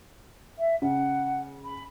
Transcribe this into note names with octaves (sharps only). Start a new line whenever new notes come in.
E5
C#3 F#5
B5